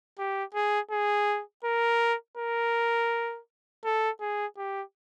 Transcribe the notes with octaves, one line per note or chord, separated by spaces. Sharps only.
G4
G#4
G#4
A#4
A#4
A4
G#4
G4